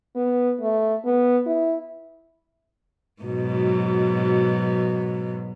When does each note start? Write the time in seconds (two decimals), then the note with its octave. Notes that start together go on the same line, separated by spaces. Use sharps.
0.16 B3
0.61 A3
1.05 B3
1.46 E4
3.22 G#2 B2 F#3